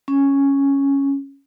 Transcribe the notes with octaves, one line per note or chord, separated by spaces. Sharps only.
C#4